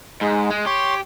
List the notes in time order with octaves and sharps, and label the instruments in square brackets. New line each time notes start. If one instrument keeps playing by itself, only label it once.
[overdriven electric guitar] G#2 [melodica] G#3
[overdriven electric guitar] G#3
[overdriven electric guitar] G4 [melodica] C#5 C6